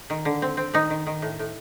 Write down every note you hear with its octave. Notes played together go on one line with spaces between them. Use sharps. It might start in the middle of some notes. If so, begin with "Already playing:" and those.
D#3
D3
C4
C4
D#3 D#4
D#3
D#3
A2
A2